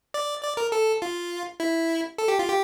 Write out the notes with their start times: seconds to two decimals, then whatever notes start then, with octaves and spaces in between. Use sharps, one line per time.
0.14 D5
0.43 D5
0.57 A#4
0.72 A4
1.02 F4
1.60 E4
2.18 A4
2.28 G4
2.39 F4
2.49 G4